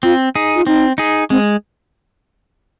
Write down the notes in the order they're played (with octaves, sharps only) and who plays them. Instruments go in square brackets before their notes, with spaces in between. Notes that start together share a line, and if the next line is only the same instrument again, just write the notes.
[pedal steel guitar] C4 [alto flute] F4
[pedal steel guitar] D#4 G#4
[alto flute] F4
[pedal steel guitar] C4 [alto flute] D#4
[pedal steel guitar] D#4 G#4
[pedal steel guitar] G#3 [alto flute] C4